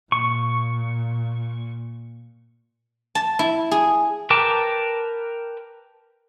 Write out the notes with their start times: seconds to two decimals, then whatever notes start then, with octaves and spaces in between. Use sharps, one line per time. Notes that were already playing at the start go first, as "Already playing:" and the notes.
0.12 A#2 C#6
3.15 A5
3.39 E4
3.71 G#4
4.30 A#4 B4 G5 A5 D6